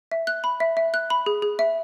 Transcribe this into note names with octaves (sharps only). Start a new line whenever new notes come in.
E5
F#6
B5
E5
E5
F#6
B5
G#4
G#4
E5